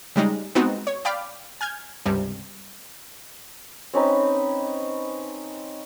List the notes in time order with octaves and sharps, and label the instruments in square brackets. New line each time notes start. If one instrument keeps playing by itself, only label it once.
[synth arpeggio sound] C#3 G3 G#3 D#4
G#3 B3 C4 D#4 F#4
C#5
D5 F5 G5 B5 D6 F6
G#5 F6 G6 G#6
C#2 G2 C3 G3
[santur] C4 C#4 D#4 B4